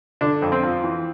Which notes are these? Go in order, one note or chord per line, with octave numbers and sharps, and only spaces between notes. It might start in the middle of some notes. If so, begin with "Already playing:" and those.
D3 D4
F2
C4
F3
E3